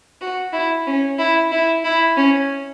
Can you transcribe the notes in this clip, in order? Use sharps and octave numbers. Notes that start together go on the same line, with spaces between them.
F#4
E4
C#4
E4
E4
E4
C#4